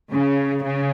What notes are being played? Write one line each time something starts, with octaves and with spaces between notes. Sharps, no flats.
C#3
C#3